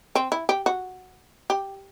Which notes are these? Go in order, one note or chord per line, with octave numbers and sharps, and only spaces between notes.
C4
E4
G4
F#4
G4